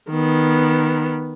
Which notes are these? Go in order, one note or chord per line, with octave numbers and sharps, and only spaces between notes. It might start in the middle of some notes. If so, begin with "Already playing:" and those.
D#3 B3